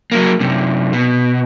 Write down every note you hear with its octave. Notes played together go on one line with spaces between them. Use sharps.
F#3 A#3
F#2 C3
B2